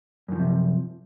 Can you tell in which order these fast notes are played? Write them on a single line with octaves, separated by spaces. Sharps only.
F#2 D#3 F3 C3